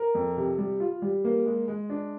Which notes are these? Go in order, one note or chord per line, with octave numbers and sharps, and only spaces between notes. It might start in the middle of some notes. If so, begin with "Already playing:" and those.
Already playing: A#4
F2
C3
G3
F4
G3
A#3
G#3
G#3
D4